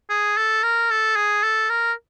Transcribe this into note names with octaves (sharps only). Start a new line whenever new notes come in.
G#4
A4
A#4
A4
G#4
A4
A#4